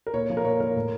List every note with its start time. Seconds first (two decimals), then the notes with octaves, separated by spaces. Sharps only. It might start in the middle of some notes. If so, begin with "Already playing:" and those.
0.07 A#4
0.13 A#2 C#5
0.30 F3
0.37 A#4
0.44 A#2 C#5
0.60 F3 A#4
0.76 A2